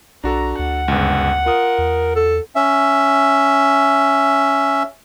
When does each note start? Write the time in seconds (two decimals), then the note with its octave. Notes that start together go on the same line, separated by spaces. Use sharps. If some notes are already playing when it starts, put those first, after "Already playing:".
0.24 B1 D4 F#4 A4 A#5
0.59 D2 F#5
0.88 G1 C#2
1.46 F4 A#4 D#6
1.78 E2
2.15 A4
2.56 C#4 E5